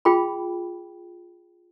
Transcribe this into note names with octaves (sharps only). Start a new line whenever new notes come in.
F4 G#4 G5 B5